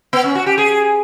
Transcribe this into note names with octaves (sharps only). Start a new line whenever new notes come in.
B3
C#4
F#4
G4
G#4